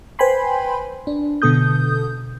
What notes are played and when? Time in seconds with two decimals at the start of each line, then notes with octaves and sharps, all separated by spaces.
0.19 B4 C5 G5 G#5 B5 C6
1.07 D4
1.42 B2 D3 B3 A4 D#6 G6